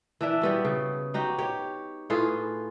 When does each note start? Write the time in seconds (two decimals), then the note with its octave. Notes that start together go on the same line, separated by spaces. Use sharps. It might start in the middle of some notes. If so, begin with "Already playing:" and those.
0.21 E3 D4 E5
0.41 G3 B3 F#4
0.65 C#3
1.14 D#4 F#4 G4
1.38 G4 C#5
2.10 A2 F4 G#4 B4